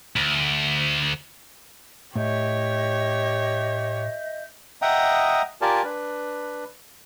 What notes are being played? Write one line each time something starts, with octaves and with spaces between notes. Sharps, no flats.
D2
A2 G4 C#5 D#5 E5 G6
D#5 E5 F#5 G5 A#5 D#6
F4 G4 A#4 D5 G#5 A5
D4 B4